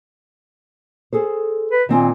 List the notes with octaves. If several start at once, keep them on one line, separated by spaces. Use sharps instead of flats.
G#4 A4 C5
B4
A#2 D#3 C4 G#5